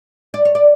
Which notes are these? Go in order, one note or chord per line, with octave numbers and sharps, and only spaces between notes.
D5
C#5
D5